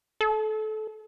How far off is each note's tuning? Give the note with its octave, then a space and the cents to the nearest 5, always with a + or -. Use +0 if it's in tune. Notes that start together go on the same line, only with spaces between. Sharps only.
A4 -25